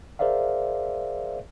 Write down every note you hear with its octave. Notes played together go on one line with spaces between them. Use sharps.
G#4 A#4 C5 D5 E5 F5